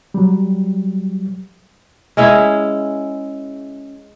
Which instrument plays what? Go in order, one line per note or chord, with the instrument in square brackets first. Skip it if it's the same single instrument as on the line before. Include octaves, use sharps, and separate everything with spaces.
[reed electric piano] F#3 G3
[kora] G#3 C#4 E4 G#4